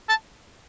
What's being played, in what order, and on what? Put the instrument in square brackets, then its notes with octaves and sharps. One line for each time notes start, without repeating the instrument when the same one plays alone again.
[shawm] A5